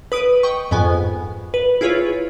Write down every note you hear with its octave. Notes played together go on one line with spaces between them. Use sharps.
B4 D#6 D7 D#7
D#5 G5 C#6
F2 G#2 B3 G#5
B4
E4 F4 G#4 B4 C#5